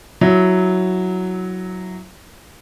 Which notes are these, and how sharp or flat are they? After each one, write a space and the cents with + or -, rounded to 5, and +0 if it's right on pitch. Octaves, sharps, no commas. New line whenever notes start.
F#3 +0 E4 +0